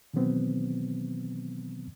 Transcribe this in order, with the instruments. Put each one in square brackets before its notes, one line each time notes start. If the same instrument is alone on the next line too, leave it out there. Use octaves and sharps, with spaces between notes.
[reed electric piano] B2 D#3 E3 F#3 B3 C4